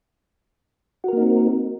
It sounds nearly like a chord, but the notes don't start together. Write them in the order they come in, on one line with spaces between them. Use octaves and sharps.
F#4 A#4 A#3 D#4 C4